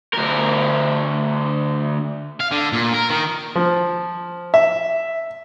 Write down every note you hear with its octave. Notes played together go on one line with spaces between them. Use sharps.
D2 A#4
F5
D3
A#2
A#4
D#3
F3
E5